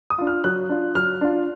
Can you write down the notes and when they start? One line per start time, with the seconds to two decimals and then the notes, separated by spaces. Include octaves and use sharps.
0.10 D#6
0.18 D4 F4
0.27 F6
0.44 F#3 F#6
0.69 D4 F4
0.95 F#3 F6
1.21 D4 F4